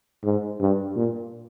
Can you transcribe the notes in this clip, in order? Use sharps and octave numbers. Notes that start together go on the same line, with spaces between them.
G#2
G2
A#2